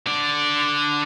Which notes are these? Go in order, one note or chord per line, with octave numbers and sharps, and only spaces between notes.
D3 D5